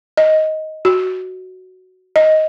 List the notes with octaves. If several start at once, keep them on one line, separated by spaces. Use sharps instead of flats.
D#5
F#4
D#5